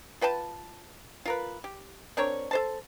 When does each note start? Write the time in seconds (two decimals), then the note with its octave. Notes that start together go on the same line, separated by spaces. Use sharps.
0.21 F4 B4 G5 A5
1.25 F4 A#4 B4
1.64 G4
2.17 C4 D4 A#4 C#5
2.51 A4 C5 A5